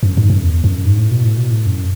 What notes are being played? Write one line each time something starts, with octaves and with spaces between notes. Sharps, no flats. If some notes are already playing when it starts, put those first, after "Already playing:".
F#2
G#2
F#2
E2
F#2
G#2
A2
B2
A2
B2
A2
F#2